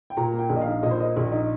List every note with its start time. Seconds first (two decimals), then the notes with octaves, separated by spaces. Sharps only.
0.10 G5
0.17 A#2 A#5
0.33 A#3 G5
0.50 A#1
0.56 D#5
0.61 D#4 F5
0.83 A#2 D#5
0.91 C5
1.00 A#3 D#5
1.16 A#1
1.32 D#4